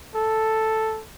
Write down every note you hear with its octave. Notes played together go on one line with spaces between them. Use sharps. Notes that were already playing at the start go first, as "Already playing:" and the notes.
A4